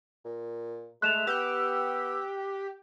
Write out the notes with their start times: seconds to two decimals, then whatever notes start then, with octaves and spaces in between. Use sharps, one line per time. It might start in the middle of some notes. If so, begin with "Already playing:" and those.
0.24 A#2
1.02 G#3 A3 F#6 E7 F7
1.27 B3 G4 E6